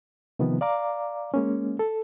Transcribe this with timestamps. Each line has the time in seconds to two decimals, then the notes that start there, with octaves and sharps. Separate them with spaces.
0.39 C3 D#3 F3 B3
0.61 D5 F5 A#5 D6
1.34 G#3 A#3 C#4
1.79 A4